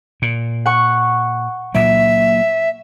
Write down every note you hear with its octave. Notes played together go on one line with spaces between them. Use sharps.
A#2
F#5 C#6
A#2 F#3 A#3 E5